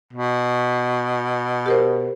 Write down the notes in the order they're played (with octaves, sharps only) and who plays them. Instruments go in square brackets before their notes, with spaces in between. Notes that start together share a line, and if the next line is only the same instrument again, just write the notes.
[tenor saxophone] B2
[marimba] G4 A#4 C5